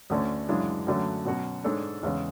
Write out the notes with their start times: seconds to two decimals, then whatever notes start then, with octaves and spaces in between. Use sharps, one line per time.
0.10 D2 D3 A3 C#4
0.48 F#2 C#3 E3 G#3 D4
0.87 F#2 D3 F#3 A3 C#4
1.25 B2 F#3 C#4 F#4
1.64 G#2 G#3 D4 A4 C#5
2.03 E2 C#3 G#3 C#4